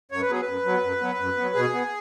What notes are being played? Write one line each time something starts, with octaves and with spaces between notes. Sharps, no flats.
F#2 C#5
B4
F#3 B3 G#4
B4
F#2
F#3 B3
F#2
F#3 B3
F#2
F#3 B3
B2 G#4
B3